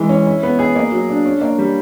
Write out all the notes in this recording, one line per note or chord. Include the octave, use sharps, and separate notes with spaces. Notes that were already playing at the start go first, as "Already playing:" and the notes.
Already playing: E3 G#3
C#4
E4
B3
G#4
A#3
F#3
D4
C#4
A#3
G3